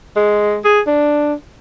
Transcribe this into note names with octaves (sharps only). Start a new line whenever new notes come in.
G#3
G#4
D4